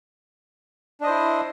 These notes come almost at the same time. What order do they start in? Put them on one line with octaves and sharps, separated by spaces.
D4 D#5 C5 E4